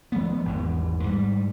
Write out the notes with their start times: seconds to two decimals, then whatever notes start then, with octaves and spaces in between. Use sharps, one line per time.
0.12 F3 G#3 A3 B3
0.45 G#1 E2 G#2
1.04 G#2 G3